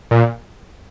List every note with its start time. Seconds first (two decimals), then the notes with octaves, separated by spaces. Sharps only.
0.11 A#2